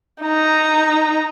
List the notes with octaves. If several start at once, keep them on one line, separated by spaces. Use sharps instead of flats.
D#4 A#5